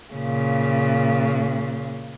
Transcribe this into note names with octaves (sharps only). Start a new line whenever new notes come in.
A#2 C#3